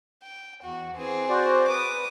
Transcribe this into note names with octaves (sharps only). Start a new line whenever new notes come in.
G5
E2 F#4
E3 C4 G#4
F#4 C5 D5
B4 D6 D#6